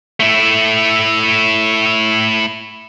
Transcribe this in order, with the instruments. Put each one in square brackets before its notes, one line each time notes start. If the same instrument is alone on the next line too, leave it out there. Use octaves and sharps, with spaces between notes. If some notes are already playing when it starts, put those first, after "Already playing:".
[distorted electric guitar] A3 E4